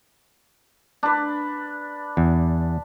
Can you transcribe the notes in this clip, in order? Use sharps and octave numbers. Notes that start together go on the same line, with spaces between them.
D4 B4
E2